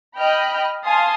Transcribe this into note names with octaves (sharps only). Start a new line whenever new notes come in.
D#5 G5 B5 F6
F5 G#5 A5 C6 D#6